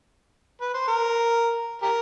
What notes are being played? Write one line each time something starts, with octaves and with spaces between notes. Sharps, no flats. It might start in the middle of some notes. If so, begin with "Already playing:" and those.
B4
C5
A#4
G4 A#4